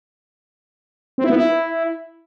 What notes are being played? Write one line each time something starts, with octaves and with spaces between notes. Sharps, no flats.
C4
E4
B3
E4